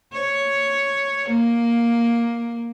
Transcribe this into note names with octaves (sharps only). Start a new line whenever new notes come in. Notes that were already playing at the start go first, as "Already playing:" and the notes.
C#5
A#3